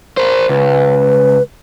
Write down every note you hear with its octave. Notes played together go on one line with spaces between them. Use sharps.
A#4 C5
C#2 B4